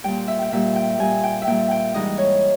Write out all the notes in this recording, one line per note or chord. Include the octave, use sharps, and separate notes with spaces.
A#2 G3 G5
E5
G5
A#2 G3 E5
G5
A#2 G3 G#5
G5
E5
A#2 G3 G5
G5
G#2 E3 G3 D#5
C#5